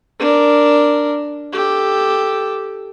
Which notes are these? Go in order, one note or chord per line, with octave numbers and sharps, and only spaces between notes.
D4 A#4
G4 A4